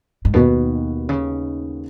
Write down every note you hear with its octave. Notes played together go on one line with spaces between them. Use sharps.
G#2
D#2 B2 D#3 B3 F#4 B4
C#3